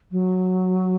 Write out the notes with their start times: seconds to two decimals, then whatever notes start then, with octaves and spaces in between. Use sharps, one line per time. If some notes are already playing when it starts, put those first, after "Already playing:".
0.11 F#3